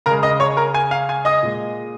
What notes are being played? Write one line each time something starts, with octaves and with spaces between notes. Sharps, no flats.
C#3 G#3 A#4 A#5
D#5 D#6
C#5 C#6
A#4 A#5
G#5
F5
G#5
D#5 D#6
A#2 G#3